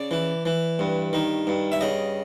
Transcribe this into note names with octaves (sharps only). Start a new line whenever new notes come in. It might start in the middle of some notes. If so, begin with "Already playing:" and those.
Already playing: C#3 D5
E3
E3
G2
D#3
G2
E5
C#3 D#5